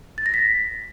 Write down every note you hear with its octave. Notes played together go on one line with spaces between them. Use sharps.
A6
A#6
B6